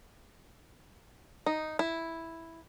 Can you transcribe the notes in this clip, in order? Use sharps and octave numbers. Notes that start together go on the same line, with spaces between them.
D#4
E4